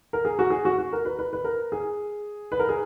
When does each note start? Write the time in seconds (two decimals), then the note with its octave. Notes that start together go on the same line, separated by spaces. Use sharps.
0.13 A#4
0.25 G#4
0.39 F#4
0.50 G#4
0.65 F#4
0.79 F#4
0.93 A#4
1.05 B4
1.19 B4
1.33 B4
1.44 A#4
1.72 G#4
2.52 B4
2.59 A#4
2.69 G#4